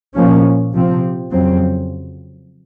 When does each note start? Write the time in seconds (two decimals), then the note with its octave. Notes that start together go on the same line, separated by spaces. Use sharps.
0.14 A#2 F3 A#3 C#4
0.73 C3 F3 C4
1.31 F2 C#3 F#3 C4